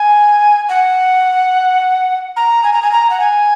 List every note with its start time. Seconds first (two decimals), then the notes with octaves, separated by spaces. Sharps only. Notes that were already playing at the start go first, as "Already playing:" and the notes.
Already playing: G#5
0.69 F#5
2.36 A#5
2.64 G#5
2.73 A#5
2.82 G#5
2.92 A#5
3.10 F#5
3.20 G#5